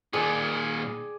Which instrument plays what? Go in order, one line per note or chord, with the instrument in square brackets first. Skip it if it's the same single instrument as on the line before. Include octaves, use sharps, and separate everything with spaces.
[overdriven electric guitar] A#2 D#3 [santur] G#4 D5